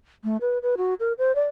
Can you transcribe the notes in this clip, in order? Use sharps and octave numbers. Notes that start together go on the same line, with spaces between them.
A3
B4
B4
F#4
A#4
C5
D5